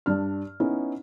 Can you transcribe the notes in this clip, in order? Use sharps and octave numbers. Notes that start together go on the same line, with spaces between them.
G2 D4 F6
B3 C#4 D#4 E4